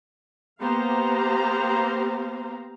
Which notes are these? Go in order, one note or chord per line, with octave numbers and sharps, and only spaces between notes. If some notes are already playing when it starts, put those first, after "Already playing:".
A#3 B3 G4 C5 F5 A#5